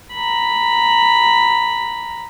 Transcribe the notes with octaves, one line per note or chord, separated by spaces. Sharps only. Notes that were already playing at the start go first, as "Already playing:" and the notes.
A#5 B5